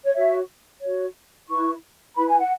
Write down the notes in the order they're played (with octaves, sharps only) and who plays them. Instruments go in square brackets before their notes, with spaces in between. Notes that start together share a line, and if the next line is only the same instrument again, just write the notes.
[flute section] C#5
F#4 C#5 E5
F#4 C#5
E4 B4 C#6
E4 B4 B5
G#5
F#5